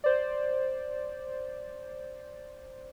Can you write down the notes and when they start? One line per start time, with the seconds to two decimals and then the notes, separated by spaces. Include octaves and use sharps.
0.04 C5 D5